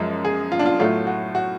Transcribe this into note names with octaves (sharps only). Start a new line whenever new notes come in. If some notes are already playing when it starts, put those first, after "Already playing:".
Already playing: F#2 F3 G#3
G#4
F4
D4
F4
A2 F#3 A3 F4
F#4
F#4